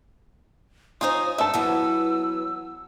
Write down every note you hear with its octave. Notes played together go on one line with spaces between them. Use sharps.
D#4 F4 C5 C#5 G#5 D#6
G2 A4 E5 E6
E3 F#3 B3